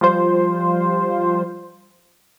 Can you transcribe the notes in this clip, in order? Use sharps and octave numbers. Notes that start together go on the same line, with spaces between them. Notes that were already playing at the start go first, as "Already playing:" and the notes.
F3 G3 F4 C5